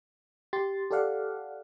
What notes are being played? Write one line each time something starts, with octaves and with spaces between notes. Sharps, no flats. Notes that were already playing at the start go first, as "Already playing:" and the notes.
G4 C6 A6
G4 A4 D5 F5 F#5